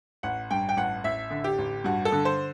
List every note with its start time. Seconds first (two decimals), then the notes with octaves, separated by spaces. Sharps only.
0.23 A1 F#5
0.51 G2 G5
0.69 G5
0.76 A1 F#5
1.04 A1 E5
1.30 D3
1.44 G4
1.58 A1
1.84 G2 F#4
2.05 A4
2.12 D3
2.25 C5